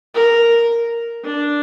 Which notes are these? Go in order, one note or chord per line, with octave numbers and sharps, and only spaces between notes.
A#4
D4